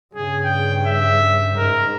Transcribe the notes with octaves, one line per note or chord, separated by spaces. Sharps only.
G2 C#3 G#4
G5
E5
G#2 A#4